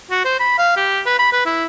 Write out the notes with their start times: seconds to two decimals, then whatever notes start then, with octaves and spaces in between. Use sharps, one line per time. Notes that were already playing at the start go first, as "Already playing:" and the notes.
0.11 F#4
0.25 C5
0.40 B5
0.58 F5
0.76 G4
1.06 B4
1.19 B5
1.33 B4
1.46 E4